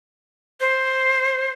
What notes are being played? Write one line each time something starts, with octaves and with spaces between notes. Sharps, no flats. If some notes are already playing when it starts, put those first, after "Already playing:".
C5